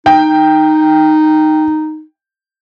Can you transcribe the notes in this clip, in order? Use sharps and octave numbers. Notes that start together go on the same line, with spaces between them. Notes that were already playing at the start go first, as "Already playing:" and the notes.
D#4 G5